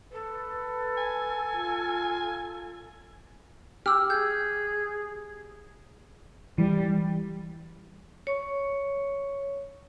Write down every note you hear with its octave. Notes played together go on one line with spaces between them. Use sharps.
A4 B4
G#5
F4
G4 E6 F6
G#4 G6
E3 G3
C#5 C#6